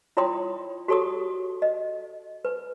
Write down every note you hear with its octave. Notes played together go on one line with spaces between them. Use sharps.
E4 F4 C#5 G5 C6 D#6
F#4 G4 A4 C#5 C#6 D#6
D#5
B4